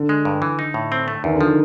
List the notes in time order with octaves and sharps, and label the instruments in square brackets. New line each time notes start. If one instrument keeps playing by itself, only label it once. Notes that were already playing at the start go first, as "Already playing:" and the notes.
Already playing: [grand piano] D3
[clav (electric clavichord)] G#3
G2
E3
D#4
A2
C4
A3
[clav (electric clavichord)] E2 [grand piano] D#3
[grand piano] D3
[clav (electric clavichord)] F3
[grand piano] D#3